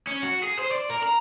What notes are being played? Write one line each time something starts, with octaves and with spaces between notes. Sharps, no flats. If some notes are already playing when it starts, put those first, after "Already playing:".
C#4
F#4
G#4
C5
D5
A#4
A#5